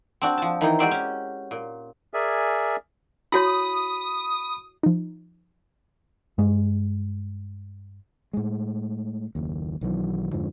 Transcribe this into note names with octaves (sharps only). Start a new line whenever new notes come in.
C4 D4 F#4
F3 A5
D#3 E3 D#4
G#3 F#4 G4 D5 E5 C6
C#4
A#2
G#4 A#4 D5 E5 G#5
E4 F#4 C#5 B5 D#6
F3 D#4
G2 G#3
A2 G#3
F#1 D#2
B1 D#3 E3 F#3
F2 G#2 D3 F3